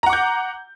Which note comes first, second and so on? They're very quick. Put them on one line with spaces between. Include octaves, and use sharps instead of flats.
A#5 F#5 D6 G6